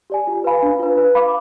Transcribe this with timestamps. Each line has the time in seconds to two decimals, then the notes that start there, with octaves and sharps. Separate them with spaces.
0.10 G4 D5 G#5
0.27 F4
0.44 B4 F5 G#5 B5
0.63 D4
0.79 F4 B4
0.97 B4
1.15 F5 B5 D6